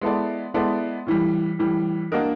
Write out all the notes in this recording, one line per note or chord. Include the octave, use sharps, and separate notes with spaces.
G#3 B3 E4 A4 D5
G#3 B3 E4 A4 D5
A2 E3 G3
A2 E3 G3
A#3 D4 F#4 A#4 D#5